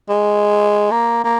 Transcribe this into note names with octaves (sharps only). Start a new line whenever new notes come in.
G#3
A#3
A#3